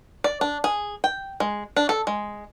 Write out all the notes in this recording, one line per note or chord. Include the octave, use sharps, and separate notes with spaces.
D5
D4
G#4
G5
G#3
D4
A4
G#3